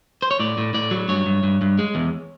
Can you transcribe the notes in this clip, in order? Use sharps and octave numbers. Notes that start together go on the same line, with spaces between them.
C5
C#5
A2 D5
A2
A2 D5
F#3
G2 C#5
G2
G2
G2
G#3
E2